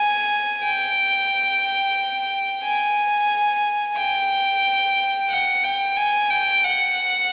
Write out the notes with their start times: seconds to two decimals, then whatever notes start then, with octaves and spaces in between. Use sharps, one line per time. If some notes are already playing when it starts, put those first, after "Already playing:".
Already playing: G#5
0.64 G5
2.64 G#5
3.97 G5
5.30 F#5
5.63 G5
5.97 G#5
6.30 G5
6.64 F#5